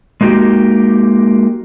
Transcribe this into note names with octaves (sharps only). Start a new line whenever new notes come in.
G#3 A#3 D#4 F#4 G4